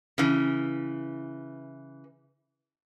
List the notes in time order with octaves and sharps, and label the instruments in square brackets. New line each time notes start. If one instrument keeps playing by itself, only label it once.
[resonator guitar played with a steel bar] C#3 E3